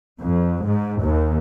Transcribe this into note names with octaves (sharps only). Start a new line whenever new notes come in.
F2
G#2
D#2